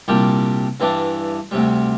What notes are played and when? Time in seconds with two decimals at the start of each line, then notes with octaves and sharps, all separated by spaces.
0.08 C2 A#2 G3 D4 G4
0.80 G2 E3 G3 D4
1.51 D2 C3 G3